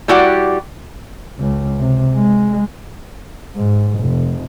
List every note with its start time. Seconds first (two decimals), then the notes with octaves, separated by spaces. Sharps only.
0.08 G3 E4 F#4 G4 D5 F#5
1.39 C#2
1.79 C3
2.15 G#3
3.56 G#2
4.00 F1